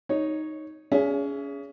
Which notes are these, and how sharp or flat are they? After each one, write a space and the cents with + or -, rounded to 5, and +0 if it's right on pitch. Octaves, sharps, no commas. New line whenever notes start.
D#4 +0 C#5 +0
C#4 +30 G#4 +0 E5 +35